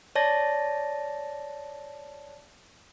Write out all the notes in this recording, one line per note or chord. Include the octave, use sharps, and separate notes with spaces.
C#5 D5 A5 A6 A#6